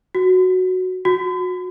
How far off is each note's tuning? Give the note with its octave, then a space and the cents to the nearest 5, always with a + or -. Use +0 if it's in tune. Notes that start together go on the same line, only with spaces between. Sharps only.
F#4 +0
F#4 -25